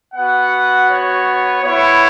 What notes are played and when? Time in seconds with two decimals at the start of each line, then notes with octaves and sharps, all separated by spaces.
0.15 B3 F#4 F#5
0.88 C#5
1.62 B3 E4 C#5